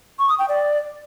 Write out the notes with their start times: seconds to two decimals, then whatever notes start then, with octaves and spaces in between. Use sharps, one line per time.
0.19 C#6
0.29 D#6
0.39 G5
0.49 D5